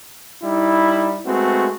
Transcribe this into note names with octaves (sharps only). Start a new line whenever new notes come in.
G3 D#4 E4
G#3 A3 B3 C4 F#4